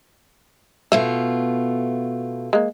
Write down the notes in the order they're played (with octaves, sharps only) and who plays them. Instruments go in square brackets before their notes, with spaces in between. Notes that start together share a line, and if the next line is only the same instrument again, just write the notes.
[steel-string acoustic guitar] B2 A3 F4 [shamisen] E5
[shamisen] G#3 A#3